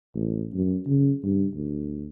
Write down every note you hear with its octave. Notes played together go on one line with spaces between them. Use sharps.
A1
F#2
C#3
G2
D2